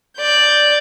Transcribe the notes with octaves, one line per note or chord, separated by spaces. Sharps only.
D5 G6